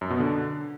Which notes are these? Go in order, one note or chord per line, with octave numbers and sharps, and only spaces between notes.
F#2
B2
D3